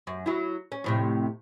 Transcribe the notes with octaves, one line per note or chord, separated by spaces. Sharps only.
F#2
F#3 E4
C#4
F2 A2 C3